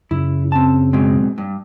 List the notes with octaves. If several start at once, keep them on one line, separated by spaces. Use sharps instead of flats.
F#2 C#3 E4
C4 A5
B2 G#3 C4
G2